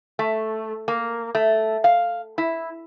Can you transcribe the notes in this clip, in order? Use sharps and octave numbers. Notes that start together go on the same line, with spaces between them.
A3
A#3
A3
F5
E4